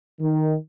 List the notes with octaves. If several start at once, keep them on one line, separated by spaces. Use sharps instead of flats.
D#3